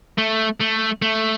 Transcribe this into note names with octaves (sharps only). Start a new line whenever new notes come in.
A3
A3
A3